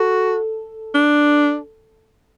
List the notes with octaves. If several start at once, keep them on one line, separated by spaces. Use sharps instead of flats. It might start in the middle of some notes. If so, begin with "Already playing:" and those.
Already playing: F#4 A4
D4